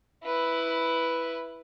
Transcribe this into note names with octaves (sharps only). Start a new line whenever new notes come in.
E4 B4